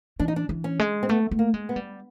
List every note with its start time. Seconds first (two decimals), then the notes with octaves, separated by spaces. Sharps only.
0.20 E3 D4
0.28 D#4
0.36 D4
0.49 E3
0.64 C#4
0.79 G#3
1.03 C4
1.09 A3 B3
1.31 A3
1.39 A#3
1.54 G#3
1.69 B3
1.76 G3